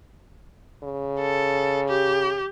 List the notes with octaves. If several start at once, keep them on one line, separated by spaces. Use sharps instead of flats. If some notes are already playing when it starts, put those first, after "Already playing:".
C#3
A4
G4